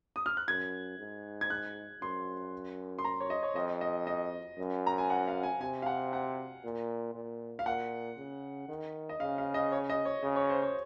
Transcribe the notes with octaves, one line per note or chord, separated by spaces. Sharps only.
D#6
F6
F#6
F#2 G#6
G#2
G#6
F#6
F#2 C6
C6
A#5
C#5
D#5
C#5
F2 D#5
D#5
D#5
F#2
A#5
G#5
F#5
F5
G#5
C3 G#5
F5
F#5
F#5
A#2
A#2
F5
A#2 F#5
C#3
D#3
D#5
C#3 F5
F5
D#5
C#5
D#5
C#5
C#3 D#5
C#5
C5
C#5